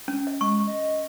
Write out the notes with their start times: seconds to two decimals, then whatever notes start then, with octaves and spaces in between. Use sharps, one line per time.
0.08 C#4
0.27 D#5
0.41 G#3 C#6
0.67 D#5